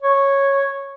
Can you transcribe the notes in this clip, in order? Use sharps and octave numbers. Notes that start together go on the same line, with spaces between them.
C#5